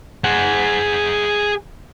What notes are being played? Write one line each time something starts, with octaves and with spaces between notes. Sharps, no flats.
G#4 F#5